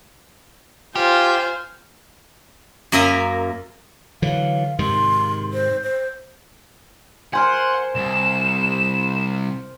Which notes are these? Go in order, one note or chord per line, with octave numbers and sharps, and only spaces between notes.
F4 G4 C5 G#5 F6
F#2 A#3 A#4 E5 G#5 A#5
D3 E3 F#3 F5
G#2 C3 D#3 C6
C5
C5
A#4 C5 F#5 G#5 C6
C2 E7